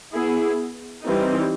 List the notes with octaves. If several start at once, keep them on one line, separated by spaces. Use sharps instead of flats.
B3 E4 G#4
E3 G3 C4 D#4